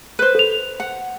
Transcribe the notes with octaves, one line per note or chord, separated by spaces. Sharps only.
B4 C5
A4 F7
F#5